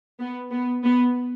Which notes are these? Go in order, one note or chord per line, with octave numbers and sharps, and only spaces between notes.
B3
B3
B3